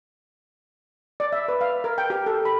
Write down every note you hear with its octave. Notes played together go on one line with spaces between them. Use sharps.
D5
E5
B4
F5
A#4
G5
G4
A4
B5